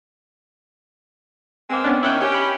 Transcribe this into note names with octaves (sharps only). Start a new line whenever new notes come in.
G#3 A#3 C4
B3 C#4 D4
D#3 C#4 E4 F#5 G5
C#4 G4
G5 B5